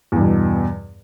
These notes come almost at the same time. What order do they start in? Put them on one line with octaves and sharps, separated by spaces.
E2 G2 B2